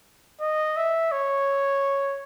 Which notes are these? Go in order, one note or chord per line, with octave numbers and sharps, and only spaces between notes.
D#5
E5
C#5